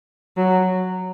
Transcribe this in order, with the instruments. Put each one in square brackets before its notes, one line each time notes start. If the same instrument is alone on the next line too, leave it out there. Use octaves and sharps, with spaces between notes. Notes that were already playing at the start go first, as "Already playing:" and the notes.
[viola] F#3